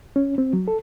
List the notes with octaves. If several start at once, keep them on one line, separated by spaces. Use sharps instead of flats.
C#4
C4
F#3
A4